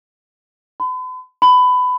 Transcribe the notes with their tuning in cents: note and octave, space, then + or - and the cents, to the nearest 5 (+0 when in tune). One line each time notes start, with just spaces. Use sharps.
B5 +40
B5 +20